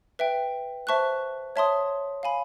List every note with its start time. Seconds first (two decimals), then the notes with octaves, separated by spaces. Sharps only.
0.19 B4 E5 G5
0.87 C5 E5 A5 C#6 F#6
1.56 C#5 E5 A5 C6 D#6
2.23 F5 G#5 B5